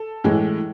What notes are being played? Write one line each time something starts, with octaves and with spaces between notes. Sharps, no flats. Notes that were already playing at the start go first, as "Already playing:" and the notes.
Already playing: A4
A2 E3 G#3